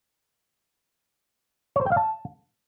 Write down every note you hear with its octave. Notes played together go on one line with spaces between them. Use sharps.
C#5
C5
G5
F5
A5